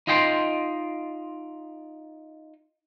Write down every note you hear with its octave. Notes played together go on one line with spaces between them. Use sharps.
D#4 F4 D#5 G5 A#5 C6